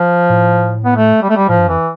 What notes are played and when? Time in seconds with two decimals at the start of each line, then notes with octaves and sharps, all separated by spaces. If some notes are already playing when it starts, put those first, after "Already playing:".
Already playing: F3
0.29 A2
0.85 B3
0.96 A3
1.22 G3
1.30 A3
1.36 G3
1.48 A2 F3
1.58 G2
1.68 F2 E3